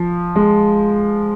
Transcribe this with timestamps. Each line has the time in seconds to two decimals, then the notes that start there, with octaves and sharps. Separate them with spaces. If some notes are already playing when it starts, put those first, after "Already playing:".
Already playing: F3
0.36 G#3